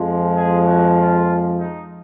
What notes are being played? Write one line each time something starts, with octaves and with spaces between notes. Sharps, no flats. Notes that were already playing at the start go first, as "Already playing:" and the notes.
Already playing: F2 F3 G#3
G#4
F#4
F4
D#4